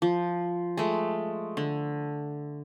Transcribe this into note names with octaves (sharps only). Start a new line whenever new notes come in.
F3
G#3 A3
D3